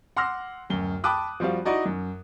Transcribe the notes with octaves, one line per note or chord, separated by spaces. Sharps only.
F#5 C6 D6 E6 F6 A#6
D1 F#2 G7
G5 A5 B5 D6 D#6 F#6
F3 G3 C4 F#4 F5
D#4 E4 F#4 D5 D#5 A#5
F#2